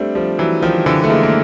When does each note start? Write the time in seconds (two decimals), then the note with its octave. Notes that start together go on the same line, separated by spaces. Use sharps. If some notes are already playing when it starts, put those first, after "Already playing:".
Already playing: G3 A3 C4 D4
0.15 F3 G3
0.38 E3 F#3
0.62 D#3 F3
0.86 D3 E3
1.04 A3
1.10 G#3 A#3
1.23 A#3